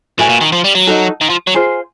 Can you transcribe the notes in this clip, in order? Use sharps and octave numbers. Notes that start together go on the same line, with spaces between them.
A2 F#4 B4 E5 G#5
A#2
D#3
F3
G3
F#3
D#4 F#4 A4
D#3
F3
F#3
F4 G#4 C5